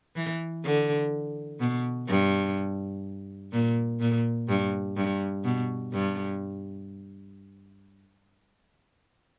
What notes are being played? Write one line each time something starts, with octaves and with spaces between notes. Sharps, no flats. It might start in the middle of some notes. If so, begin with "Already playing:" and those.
E3
D3
B2
G2
A#2
A#2
G2
G2
B2
G2